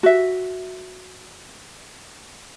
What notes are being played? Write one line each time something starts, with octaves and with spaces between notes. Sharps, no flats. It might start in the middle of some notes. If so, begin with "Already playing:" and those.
F#4 E5